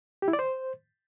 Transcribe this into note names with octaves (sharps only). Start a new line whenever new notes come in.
G4
E4
D5
C5